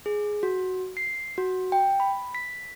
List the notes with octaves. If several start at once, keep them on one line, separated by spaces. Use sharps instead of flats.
G#4
F#4
C7
F#4
G5
B5
B6